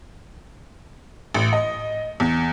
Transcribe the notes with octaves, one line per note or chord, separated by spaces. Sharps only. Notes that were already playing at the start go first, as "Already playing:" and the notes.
A1
D#5
E2